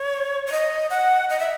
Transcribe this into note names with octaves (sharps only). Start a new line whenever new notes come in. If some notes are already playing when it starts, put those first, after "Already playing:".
Already playing: C#5
C#5
D#5
F#5
D#5
E5